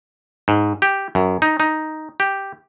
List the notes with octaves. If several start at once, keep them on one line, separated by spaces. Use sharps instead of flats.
G#2
G4
F#2
D#4
D#4
G4